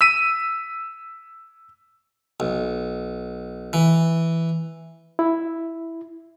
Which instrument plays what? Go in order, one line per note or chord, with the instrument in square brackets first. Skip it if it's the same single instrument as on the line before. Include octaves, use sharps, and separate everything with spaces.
[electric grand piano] E6 B6 D#7
[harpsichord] B1
E3
[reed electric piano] E4